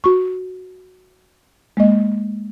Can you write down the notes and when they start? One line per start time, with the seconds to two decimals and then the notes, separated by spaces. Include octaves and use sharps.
0.04 F#4 C#6
1.77 G#3 A#3 D#5